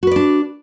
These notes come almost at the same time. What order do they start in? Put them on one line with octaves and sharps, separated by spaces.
F#4 B4 D5 D4